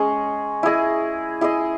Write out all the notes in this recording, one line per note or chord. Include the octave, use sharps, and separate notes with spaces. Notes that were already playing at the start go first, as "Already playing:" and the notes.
Already playing: G#3 C#4 G#4
E4 G#4 D#5
E4 G#4 D#5